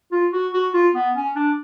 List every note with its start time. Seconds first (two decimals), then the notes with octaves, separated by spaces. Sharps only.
0.12 F4
0.33 F#4
0.54 F#4
0.74 F4
0.95 B3
1.15 C#4
1.36 D4